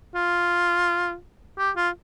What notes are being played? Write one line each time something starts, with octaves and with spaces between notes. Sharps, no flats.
F4
G4
F4